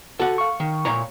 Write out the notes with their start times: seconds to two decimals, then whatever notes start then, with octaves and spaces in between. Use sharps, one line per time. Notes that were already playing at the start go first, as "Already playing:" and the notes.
0.19 F#4 A4 F#5
0.38 F5 C#6
0.60 D#3
0.85 A#2 C#5 A#5